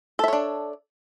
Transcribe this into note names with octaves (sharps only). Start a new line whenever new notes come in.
D4 A4 C#5 E5